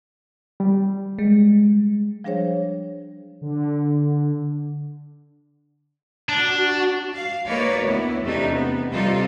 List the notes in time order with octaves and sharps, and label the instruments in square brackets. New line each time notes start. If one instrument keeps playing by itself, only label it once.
[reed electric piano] G3
[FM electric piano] G#3
[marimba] F3 G3 D4 G#4 C5 C#5
[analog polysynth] D3
[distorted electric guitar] D4 [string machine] F#4
[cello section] F5
A#3 D#4 F#4 B4 C#5 D5
D2 B3 E4
E2 C3 A3 D4 D#4
B3
C3 G3 D#4 F4 A4